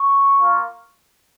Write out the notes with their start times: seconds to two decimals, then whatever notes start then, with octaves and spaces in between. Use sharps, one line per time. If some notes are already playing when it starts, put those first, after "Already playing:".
Already playing: C#6
0.37 A#3 F4